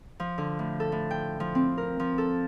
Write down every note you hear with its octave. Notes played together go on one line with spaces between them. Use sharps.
F3
D3
A2
A4
A2
G5
F3
C4
A#4
F3
A4